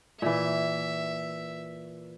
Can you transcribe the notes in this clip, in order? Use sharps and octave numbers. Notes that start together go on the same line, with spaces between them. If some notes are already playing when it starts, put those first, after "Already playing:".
A#2 E3 E5